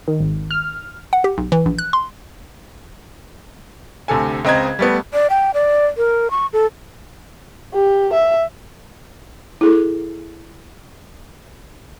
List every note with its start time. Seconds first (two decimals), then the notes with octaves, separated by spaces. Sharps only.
0.08 D#3
0.20 G#1
0.51 F6
1.13 F#5
1.24 G4
1.38 B1
1.52 E3
1.66 A#1
1.78 F#6
1.93 C6
4.08 D2 C3 A4 G#5
4.45 C#2 C4 D#5 A#5 G#6
4.79 G3 A3 B3
5.13 D5
5.30 G5
5.54 D5
5.97 A#4
6.31 C#6
6.53 A4
7.74 G4
8.13 E5
9.61 E4 G#4 A4